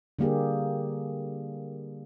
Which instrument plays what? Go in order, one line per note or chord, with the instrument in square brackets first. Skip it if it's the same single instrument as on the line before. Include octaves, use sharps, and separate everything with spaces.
[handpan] D3 G3 A#3 G4 G#4